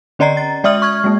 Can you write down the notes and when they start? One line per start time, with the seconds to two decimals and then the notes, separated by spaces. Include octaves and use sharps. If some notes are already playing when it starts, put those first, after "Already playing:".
0.19 D3 C#4 D5 D#5 A#5 C7
0.37 A6
0.64 G#3 D5 E5 D#6 F6 F#7
0.82 C#6 F6 G#6
1.04 G#3 A#3